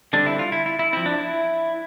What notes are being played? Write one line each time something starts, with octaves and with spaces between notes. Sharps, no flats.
D3 G3 C4 D4
E4
F4
E4
E4
E4
F3 C4 E4
D4
E4